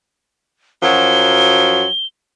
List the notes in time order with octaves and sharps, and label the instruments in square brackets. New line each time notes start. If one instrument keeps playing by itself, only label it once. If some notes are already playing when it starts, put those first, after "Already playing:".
[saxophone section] F#2 F3 F#3 [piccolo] G7